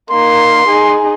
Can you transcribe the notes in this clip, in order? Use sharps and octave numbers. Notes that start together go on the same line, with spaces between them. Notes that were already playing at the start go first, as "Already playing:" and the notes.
A#3 D#4 C6
D#4 G#4